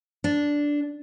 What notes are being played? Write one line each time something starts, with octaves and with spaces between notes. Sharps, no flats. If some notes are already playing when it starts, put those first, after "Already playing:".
D4